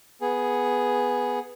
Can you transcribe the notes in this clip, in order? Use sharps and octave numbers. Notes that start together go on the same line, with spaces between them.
B3 G#4